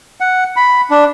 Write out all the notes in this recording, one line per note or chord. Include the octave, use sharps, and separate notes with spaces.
F#5
B5
D4